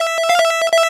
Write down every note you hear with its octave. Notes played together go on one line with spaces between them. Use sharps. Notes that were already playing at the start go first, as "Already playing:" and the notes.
Already playing: E5
F5
E5
E5